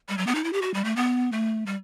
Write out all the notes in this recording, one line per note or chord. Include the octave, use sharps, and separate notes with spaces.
G3
F#3
B3
D#4
E4
G4
F#4
G3
A3
B3
A3
G3